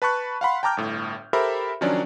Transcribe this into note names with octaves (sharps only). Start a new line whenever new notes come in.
B4 A5 B5 C#6 F#6
F5 F#5 B5 C6
G5 A5 A#5 D6 F6 G6
G1 A2
G4 A4 A#4 C5 E5 B5
D#3 F3 F#3 C#4 D4 D5